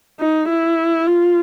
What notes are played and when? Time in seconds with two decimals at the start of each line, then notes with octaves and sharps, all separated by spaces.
0.20 D#4
0.49 E4
1.07 F4